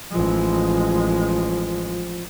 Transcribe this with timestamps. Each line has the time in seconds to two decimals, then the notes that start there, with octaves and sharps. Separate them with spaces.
0.12 A1 F3 G#3